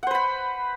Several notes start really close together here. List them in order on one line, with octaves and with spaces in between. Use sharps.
F#5 C5 B4 B5